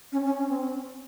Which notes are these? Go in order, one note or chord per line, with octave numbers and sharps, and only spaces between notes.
C#4
C#4
C#4
C4